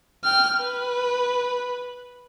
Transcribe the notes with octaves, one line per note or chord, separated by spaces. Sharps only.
G5 F6
B4